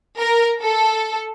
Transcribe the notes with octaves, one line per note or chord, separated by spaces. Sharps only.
A#4
A4